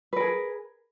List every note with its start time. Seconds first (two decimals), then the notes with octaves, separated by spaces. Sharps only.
0.13 B4
0.16 A#4
0.20 G#4